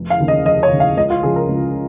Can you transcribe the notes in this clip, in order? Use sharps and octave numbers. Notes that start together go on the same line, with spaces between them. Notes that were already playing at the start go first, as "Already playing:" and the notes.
Already playing: F1
F5
D#2 C#3
D#5
F1 D#5
C#5
D#2 C#3
F5
C#2 D#5
F4
C#3 F3 G#4
A#4
C#2